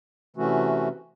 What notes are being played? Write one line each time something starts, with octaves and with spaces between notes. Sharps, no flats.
C3 E3 A3 C#4 F#4